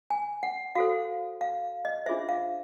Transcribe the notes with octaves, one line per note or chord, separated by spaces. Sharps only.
G#5
F#5
F#4 A4 C5 F5
F5
D#5
D4 F4 G#4 C5 E5
F5